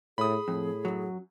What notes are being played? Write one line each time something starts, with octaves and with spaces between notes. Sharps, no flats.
A2 G#4 B5 D#6
F2 A2
F#2 F#3